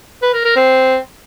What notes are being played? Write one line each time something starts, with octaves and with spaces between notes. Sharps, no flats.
B4
A#4
A#4
C4